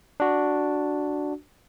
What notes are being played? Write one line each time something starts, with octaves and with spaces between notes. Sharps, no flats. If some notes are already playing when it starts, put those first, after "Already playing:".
D4 F#4